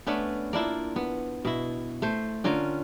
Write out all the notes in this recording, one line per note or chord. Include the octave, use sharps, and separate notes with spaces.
A3 B3 C#4 D4
A#3 D4 E4 F4
B3
B2 E4
A3 C5
D3 C#4 F4 A#4